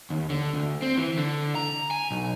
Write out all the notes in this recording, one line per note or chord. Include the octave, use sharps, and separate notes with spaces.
D#2
D3
D2
C4
E3
D3
A#5
G#5
B1